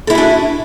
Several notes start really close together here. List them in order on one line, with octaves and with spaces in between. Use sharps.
A4 E4 G#4 F#4 D4